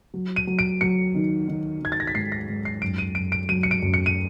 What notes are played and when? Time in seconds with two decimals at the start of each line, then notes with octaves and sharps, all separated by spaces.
0.14 F#3
0.36 D#7
0.47 F#3
0.59 D7
0.81 F#3 C#7
1.15 D#3
1.48 D#3
1.81 D#3 G#6
1.92 A6
2.00 A#6
2.07 B6
2.15 G#2 C7
2.32 A#6
2.49 G#2
2.65 C7
2.82 F#2 D7
2.98 D#7
3.15 F#2 D7
3.32 D7
3.49 F#3 D#7
3.63 C#7
3.71 D7
3.82 F#2
3.94 C#7
4.06 D#7